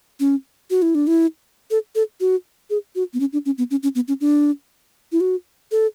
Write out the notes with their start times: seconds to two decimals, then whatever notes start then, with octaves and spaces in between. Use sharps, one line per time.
0.20 C#4
0.70 F#4
0.82 E4
0.95 D4
1.07 E4
1.71 A4
1.95 A4
2.20 F#4
2.70 G#4
2.95 F#4
3.14 B3
3.20 C#4
3.33 D4
3.46 C#4
3.58 B3
3.71 C#4
3.83 C#4
3.95 B3
4.08 C#4
4.21 D4
5.12 E4
5.21 F#4
5.71 A4